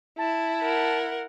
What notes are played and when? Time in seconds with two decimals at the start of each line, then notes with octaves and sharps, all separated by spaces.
0.18 E4 A5
0.62 A#4 F#5